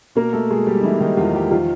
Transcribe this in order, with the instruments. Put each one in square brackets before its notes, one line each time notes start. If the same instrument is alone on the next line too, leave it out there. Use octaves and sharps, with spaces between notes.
[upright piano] B2 A#3 A#4
A3 A4
B2 G#3 G#4
G3 G4
D#4
B2 E3 E4
D#3 D#4
E2 F3 F4
G3 G4
D#3 F3 F4